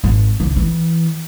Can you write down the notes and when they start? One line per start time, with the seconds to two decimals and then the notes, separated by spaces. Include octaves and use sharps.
0.04 G#1
0.40 C#2
0.56 E3